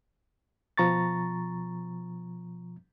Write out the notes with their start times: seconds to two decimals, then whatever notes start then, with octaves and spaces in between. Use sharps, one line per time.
0.78 B2 F3 A#5 C#6 A6